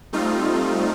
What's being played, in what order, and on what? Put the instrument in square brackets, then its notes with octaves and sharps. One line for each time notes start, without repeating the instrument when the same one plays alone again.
[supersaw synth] G3 A3 C4 D#4 F4